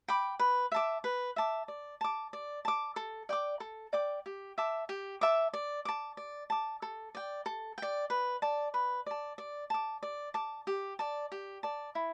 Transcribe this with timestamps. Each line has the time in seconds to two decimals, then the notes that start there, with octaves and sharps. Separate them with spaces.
0.08 G5 B5 D6
0.39 B4
0.72 E5 A5 D6
1.04 B4
1.36 E5 A5 D6
1.68 D5
2.01 A5 D6
2.33 D5
2.65 A5 D6
2.96 A4
3.29 D5 G5 D6
3.60 A4
3.93 D5 G5 D6
4.26 G4
4.58 E5 A5 D6
4.89 G4
5.21 E5 A5 D6
5.53 D5
5.85 A5 D6
6.17 D5
6.50 A5 D6
6.82 A4
7.15 D5 G5
7.46 A4
7.78 D5 G5
8.10 B4
8.42 D5 A5
8.74 B4
9.06 D5 A5
9.38 D5
9.70 A5 D6
10.03 D5
10.34 A5 D6
10.67 G4
10.99 D5 A5
11.32 G4
11.63 D5 A5
11.95 E4